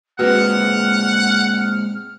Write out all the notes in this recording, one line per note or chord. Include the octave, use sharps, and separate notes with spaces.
A#2 G#3 C4 F#4 B4 F#5 F6